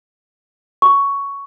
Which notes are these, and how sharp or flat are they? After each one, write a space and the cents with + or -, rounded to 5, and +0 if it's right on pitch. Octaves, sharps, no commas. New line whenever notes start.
C#6 +10